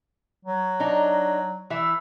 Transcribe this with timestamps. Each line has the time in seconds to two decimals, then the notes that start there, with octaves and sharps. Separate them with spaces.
0.45 F#3
0.80 D4 D#4
1.70 E3 E5